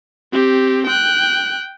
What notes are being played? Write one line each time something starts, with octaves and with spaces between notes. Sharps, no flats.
C4 G4
G5 F#6